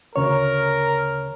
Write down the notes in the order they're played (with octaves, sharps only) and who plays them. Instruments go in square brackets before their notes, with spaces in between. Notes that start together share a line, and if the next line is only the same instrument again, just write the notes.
[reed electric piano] D2 C#3 C#5 [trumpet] A#4